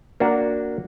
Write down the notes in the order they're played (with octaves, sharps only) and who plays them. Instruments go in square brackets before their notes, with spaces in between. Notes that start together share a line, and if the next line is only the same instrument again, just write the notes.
[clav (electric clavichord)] A#3 D4 F#4